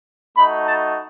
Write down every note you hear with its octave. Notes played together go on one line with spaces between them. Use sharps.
A3 D#4 F#4 B5
A5